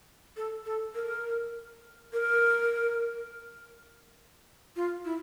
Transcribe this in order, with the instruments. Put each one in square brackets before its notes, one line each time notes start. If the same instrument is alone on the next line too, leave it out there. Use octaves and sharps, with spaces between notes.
[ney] A4
A4
A#4
A#4
F4
E4